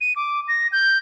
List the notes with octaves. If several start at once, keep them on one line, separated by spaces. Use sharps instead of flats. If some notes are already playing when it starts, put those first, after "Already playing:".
D#7
D6
A#6
G6